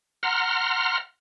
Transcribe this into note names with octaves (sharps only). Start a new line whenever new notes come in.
F#5 A#5 C6 F6